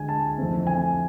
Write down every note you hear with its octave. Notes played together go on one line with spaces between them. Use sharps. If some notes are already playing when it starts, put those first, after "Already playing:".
Already playing: D2 D3 G#3 D4 G#5
A5
F2 E3 A3 C4
G#5